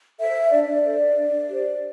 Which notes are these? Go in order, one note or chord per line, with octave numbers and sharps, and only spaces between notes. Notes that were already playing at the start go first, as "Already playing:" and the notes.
A4 C5 E5
D4 D5
D5
A4 C5
D4
G4 C5